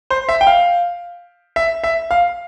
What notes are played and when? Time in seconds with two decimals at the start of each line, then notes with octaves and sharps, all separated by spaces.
0.10 C5
0.29 E5
0.41 G5
0.47 F5
1.56 E5
1.84 E5
2.11 F5